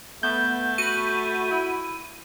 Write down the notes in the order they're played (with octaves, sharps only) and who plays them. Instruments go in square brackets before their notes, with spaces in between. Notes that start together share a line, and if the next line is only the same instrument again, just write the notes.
[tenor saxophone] A3 [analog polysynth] B3 [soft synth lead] G6
[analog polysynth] F#4 B5 [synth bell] D#7
[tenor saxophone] E4